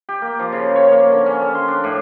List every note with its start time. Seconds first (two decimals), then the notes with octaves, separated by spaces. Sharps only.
0.09 G4
0.22 A#3
0.39 F3
0.52 C#3
0.76 C#5
0.92 A#3
1.12 D3
1.26 C#4
1.42 A4
1.55 C6
1.68 D4
1.84 A2